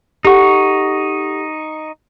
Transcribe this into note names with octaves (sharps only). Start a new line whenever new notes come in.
D#4 G4 A4 F#5 C#6